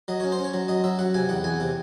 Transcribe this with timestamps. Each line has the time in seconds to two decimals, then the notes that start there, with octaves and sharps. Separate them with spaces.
0.08 F#3 D#5
0.20 C#4 C#5
0.32 C5
0.39 C#4
0.44 C#5
0.54 F#3
0.68 F#3 D#5
0.84 F#3 E5
0.99 F#3 F#5
1.14 C3 G#5
1.29 E2 F#5
1.44 E2 G#5
1.60 C3